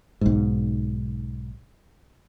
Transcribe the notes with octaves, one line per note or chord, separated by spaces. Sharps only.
B1 G#2